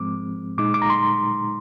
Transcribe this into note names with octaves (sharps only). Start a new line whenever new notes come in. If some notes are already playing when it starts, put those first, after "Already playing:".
Already playing: G#2 F3 G#3 C4 D6
A#2 G#3 D#4 D6
D6
A#5
C6